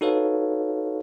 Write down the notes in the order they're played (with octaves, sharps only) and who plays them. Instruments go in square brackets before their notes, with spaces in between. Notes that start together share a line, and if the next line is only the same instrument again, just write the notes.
[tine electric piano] D#4 F#4 A4 B4 C#5 F5